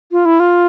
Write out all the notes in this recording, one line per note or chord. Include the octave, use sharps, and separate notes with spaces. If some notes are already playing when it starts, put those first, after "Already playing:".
F4
E4
F4